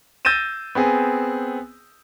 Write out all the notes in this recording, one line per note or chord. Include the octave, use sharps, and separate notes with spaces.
E6 G6 A6 A#6 D#7 E7
B3 C4 G#4